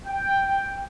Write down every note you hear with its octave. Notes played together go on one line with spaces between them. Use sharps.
G5